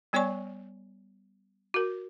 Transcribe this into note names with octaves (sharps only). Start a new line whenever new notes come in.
G3 B3 C#5 D5 G#5 C#6
F#4 A#4